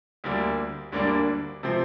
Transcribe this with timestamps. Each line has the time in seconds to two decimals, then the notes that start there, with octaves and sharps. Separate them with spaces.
0.24 D2 D3 G3 A#3 D4
0.92 D2 D3 G3 A#3 D4
1.63 C3 F3 C4